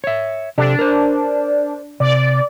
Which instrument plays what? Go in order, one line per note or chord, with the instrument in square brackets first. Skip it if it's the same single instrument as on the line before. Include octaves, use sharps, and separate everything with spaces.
[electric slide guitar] C#5 E5
[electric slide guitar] C3 G4 A4 [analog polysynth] D4
[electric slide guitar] A#4 C5
[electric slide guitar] C3 [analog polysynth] D5